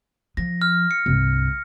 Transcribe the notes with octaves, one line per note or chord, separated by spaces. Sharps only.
F3 A#6
F6
C#7
C2 G2